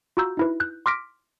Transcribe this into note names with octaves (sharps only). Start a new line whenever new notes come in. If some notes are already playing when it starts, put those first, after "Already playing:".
F4 F#4 A#5 E6 G6
D#4 E4 B4
F#6 G6
C6 D6 F6 A#6 B6 D7